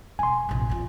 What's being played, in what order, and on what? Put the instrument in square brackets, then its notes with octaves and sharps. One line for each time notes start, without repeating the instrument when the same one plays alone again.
[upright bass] E1 [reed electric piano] G#5 C6
[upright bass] F1 A#1
E2 F4